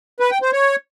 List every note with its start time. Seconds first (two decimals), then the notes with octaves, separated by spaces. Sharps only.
0.20 B4
0.31 G5
0.42 C5
0.53 C#5